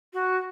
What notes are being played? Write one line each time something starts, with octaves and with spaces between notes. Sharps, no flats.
F#4